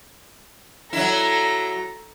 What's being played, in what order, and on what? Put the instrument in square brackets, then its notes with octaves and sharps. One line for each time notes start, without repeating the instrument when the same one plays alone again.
[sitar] F#3 E4 [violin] A4 A#5